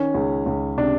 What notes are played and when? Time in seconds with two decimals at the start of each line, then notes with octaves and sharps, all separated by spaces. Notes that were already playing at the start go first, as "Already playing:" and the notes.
Already playing: D#3 C#4
0.14 C#2
0.46 C#2
0.77 C3 D4